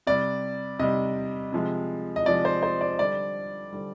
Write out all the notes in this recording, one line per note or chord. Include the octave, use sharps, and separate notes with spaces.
C3 G3 D5
C3 G3 D#5
C3 F3 G#3
D#5
C3 F3 G#3 D5
C5
C5
D5
D3 G3 D5
D3 G3